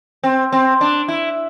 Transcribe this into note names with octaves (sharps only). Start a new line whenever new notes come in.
C4
C4
D4
E4